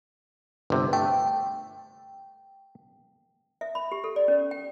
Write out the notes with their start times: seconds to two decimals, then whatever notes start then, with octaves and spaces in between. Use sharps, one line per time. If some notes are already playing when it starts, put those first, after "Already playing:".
0.70 G1 C3
0.93 A3 G5
3.61 E5
3.75 B5
3.92 G4
4.04 A4
4.16 D5
4.28 C#4
4.51 G5